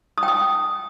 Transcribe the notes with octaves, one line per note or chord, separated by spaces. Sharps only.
D#6
G5
D#6